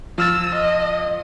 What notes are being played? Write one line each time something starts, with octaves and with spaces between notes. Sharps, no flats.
F3 E6 F6 A6
D#5